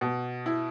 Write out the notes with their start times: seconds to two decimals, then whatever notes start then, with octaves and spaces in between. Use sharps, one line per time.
0.01 B2
0.46 E4